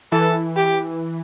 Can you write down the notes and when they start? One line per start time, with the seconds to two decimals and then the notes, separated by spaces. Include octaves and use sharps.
0.12 E3 A4
0.56 G4